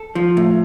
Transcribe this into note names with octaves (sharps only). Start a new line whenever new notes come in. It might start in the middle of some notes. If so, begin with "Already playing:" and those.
Already playing: A4
F3
A2